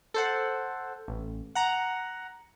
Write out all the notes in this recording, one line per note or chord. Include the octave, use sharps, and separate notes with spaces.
A4 C5 F#5
A1
F#5 A#5